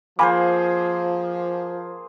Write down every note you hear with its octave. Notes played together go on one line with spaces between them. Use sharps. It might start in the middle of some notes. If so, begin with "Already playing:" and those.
F3 A#3 G#4 C5 G#5 B5 D6